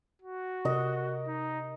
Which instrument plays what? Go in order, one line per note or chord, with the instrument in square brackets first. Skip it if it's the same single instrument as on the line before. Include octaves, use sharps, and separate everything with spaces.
[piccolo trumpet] F#4
[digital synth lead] C3 [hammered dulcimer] A#4 D#5
[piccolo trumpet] D#4